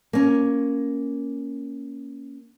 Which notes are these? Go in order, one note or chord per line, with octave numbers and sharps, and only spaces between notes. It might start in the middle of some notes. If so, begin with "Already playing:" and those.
A#3 C#4